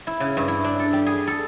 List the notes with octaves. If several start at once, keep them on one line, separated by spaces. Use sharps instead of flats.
E4
C#3
G2
E4
D4
A4
G3
G#4
A4